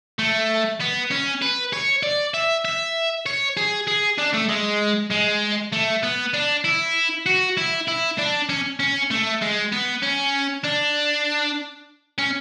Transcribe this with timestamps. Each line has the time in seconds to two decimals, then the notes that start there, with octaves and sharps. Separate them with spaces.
0.19 A3
0.80 B3
1.11 C#4
1.42 B4
1.73 C#5
2.03 D5
2.34 E5
2.65 E5
3.26 C#5
3.57 G#4
3.87 G#4
4.18 D4
4.34 A3
4.49 G#3
5.11 G#3
5.72 A3
6.03 B3
6.34 D4
6.64 E4
7.26 F#4
7.57 E4
7.88 E4
8.18 D4
8.49 C#4
8.80 C#4
9.10 A3
9.42 G#3
9.72 B3
10.03 C#4
10.64 D4
12.18 C#4